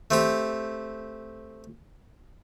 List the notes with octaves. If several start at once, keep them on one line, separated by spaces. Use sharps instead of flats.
A3 C4 G4